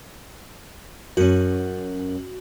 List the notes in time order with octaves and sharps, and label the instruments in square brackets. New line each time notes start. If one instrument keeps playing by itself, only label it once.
[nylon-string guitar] F#2 C#4 [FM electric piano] F#4